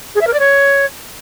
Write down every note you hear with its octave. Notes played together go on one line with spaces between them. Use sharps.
G#4
E5
A#4
D5
C#5